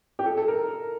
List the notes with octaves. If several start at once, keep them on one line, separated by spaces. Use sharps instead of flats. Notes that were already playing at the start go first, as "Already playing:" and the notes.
G4
A4
A4
A#4